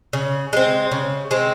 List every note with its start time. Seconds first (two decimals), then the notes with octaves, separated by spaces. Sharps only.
0.13 C#3
0.53 G#3 C4
0.92 C#3
1.31 G#3 C4